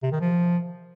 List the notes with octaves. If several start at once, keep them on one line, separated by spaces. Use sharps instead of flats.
C3
D#3
F3